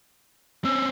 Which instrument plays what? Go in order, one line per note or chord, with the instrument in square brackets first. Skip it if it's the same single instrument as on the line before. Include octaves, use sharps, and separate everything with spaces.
[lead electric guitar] C4 C#4 [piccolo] E6